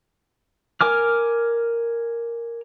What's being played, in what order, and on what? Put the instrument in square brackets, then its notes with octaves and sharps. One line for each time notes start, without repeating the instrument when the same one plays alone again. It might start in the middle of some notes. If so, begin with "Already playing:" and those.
[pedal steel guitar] A#4 G#5 D6 F6